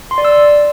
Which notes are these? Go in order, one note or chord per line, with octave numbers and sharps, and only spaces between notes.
C6
D5
E6